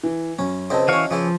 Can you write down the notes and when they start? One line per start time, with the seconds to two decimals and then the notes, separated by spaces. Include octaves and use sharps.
0.03 E3
0.39 F#2 C#4
0.70 C#2 C4 E4 C5 D#5 A5
0.88 E3 C#4 F#4 F5 C#6
1.11 C#3 E3 F3 E4